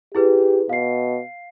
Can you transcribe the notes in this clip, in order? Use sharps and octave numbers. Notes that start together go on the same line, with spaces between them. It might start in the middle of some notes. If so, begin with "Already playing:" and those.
E4 G4 G#4 B4
B2 F5 C7